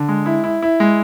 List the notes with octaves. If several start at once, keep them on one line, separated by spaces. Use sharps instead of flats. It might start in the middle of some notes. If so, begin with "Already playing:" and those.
Already playing: D3
G#3
E4
E4
E4
G#3